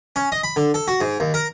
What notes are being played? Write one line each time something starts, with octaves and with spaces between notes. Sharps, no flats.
C#4
D#5
B5
D3
A4
F#4
G#2
D#2
A#4